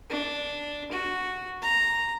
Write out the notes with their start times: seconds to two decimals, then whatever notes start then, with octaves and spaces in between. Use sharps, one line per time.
0.10 D4
0.92 F#4
1.62 A#5